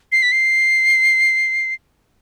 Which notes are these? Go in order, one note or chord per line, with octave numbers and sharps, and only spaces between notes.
C7
B6
C7